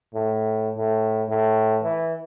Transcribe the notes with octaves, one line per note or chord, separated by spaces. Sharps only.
A2
A2
A2
E3